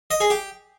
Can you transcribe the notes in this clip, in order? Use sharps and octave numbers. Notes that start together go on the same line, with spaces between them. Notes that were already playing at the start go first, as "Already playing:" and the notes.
D#5
G#4
G4